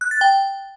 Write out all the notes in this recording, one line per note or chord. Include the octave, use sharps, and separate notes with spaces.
F#6
A6
G5